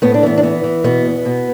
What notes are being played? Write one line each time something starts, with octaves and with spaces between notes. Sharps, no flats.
A2 B3
D4
E3 B3
D4
E3 B3
E3
B2 B3
E2
B2